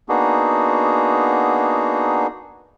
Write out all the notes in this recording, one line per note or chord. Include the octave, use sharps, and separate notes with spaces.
A#3 B3 D4 D#4 F#4 G#4